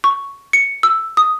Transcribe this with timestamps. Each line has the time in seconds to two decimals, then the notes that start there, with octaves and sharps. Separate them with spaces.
0.04 C#6
0.53 C#7
0.83 E6
1.17 D#6